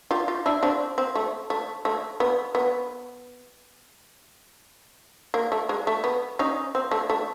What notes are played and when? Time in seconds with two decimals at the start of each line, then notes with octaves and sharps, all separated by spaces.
0.11 F4 G4
0.28 F4 G4
0.46 D4 E4
0.63 C4 D4
0.98 C4
1.15 A3
1.50 A3
1.85 A3
2.20 B3
2.55 B3
5.34 A#3
5.52 A3
5.69 G#3
5.87 A3
6.04 B3
6.39 C#4 D#4
6.75 C4
6.91 A3
7.10 A3